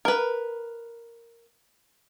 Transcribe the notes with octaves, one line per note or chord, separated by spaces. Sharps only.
A#4 B4